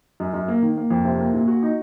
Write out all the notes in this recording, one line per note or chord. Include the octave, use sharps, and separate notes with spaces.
F#2
F#2
A#3
D#3
A#3
F2
C3
A#3
A#2
F#4
D#4